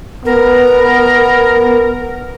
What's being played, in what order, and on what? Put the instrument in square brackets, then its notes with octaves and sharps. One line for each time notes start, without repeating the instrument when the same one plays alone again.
[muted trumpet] B3 [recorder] A#4